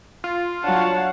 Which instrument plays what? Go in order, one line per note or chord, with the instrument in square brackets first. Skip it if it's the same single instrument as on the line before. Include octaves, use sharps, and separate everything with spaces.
[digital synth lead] F4
[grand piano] F#3 D4 [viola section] C#5 F5 F#5 [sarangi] A5